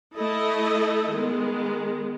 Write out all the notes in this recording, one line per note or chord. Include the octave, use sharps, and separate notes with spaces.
A3 E4 A4 D#5
D#3 G#3 B3